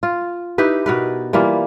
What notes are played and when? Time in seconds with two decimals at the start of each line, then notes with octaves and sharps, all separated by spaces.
0.03 F4
0.58 D#4 E4 G4 B4
0.86 B2 A#4 B4
1.33 E3 G3 A#3 F4